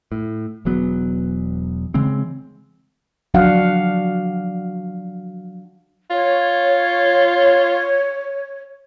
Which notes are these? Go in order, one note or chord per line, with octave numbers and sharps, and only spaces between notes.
A2
E1 E2 F#3 B3
C#3 E3 G#3 C4
F3 F#3 D4 F#4 F5 F#5
F4 C#5